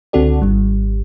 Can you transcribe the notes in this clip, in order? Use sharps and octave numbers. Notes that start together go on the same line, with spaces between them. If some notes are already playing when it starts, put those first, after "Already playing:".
C#2 D3 C4 F#4 A4 D5
G#1 G3